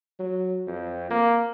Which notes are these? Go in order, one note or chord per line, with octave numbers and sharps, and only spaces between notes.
F#3
F2
A#3